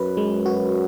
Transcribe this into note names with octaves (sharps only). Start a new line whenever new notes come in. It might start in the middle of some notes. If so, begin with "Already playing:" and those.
Already playing: F#2 B4
G#3
F#4